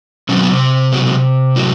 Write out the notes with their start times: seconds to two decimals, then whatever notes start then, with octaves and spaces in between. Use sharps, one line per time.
0.29 B2 F#3 C#4
0.36 C4
0.43 B3
0.51 C3 C4
0.92 B2 F#3
1.56 A2 F#3